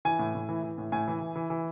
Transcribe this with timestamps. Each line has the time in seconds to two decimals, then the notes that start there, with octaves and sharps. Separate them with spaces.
0.05 E3 G#5
0.19 A2
0.35 A2
0.49 E3
0.63 E3
0.78 A2
0.92 A2 G#5
1.08 E3
1.21 E3
1.36 E3
1.50 E3